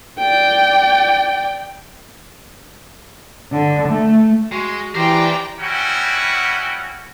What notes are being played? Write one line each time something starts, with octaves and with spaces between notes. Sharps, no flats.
D5 G5
D3
A3
G#3 F#4
E3 G4 A#4 C5 D5 G5 A#5
G3 C#4 E4 F#4 F#5 G5